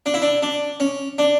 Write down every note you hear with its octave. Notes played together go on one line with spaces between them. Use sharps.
D4
E4
D4
D4
C#4
D4